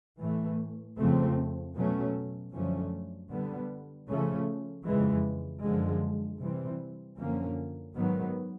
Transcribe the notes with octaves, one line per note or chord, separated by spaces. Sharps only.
A2 E3 A3
F2 C#3 F3 A3 C4
B2 F#3 A3 C#4
F#2 D3 F3 A3 C#4
D3 G3 B3
C#3 F3 A3 C#4
F2 C#3 E3 G#3
F#2 D3 F3 G#3
C3 E3 G3 C4
F#2 D3 F3 A#3 C#4
G#2 D#3 F#3 B3